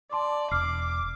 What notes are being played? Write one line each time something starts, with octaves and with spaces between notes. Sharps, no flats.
D5 A5 C6 D6
E1 D6 F6 C7